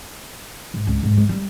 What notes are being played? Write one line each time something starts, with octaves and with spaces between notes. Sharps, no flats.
G#2
C#2
G#2
G#3
G3